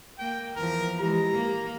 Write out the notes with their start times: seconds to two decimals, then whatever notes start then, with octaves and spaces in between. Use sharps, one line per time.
0.19 A#3 G5
0.56 E2 F3 A#4
1.00 E3 G#3 G4 A#5
1.33 A#3